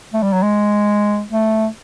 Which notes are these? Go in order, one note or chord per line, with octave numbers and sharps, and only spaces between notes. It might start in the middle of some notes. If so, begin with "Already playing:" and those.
A3
G3
F#3
G#3
A3